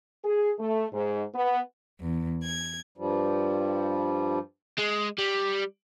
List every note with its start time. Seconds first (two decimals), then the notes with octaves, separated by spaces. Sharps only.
0.24 G#4
0.59 A3
0.93 G#2
1.34 B3
2.01 E2
2.43 G#6
2.98 G2 F3 G3
4.79 G#3
5.19 G3